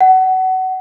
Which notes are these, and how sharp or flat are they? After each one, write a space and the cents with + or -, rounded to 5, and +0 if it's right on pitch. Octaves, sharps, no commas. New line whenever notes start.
F#5 +25